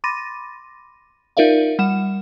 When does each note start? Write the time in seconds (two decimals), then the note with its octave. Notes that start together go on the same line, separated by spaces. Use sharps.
0.04 B5 C6 D6 A6 A#6 D#7
1.37 D#4 F4 A#4 D5 E5 F5
1.79 G3 F#5 E7